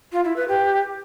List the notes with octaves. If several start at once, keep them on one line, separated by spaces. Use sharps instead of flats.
F4
E4
B4
G4